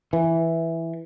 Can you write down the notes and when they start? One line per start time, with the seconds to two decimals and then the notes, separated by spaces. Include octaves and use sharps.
0.13 E3